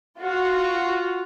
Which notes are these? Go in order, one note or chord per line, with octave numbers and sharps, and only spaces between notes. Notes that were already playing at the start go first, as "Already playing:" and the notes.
F4 F#4